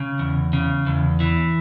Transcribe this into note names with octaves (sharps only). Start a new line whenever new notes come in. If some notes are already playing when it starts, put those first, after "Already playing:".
Already playing: C#3
E2
C#3
E2
E3